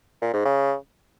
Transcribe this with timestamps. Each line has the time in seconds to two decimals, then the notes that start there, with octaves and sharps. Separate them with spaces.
0.22 A#2
0.33 G#2
0.45 C#3